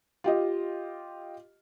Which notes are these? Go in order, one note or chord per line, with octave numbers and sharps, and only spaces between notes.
F4 G4 D#5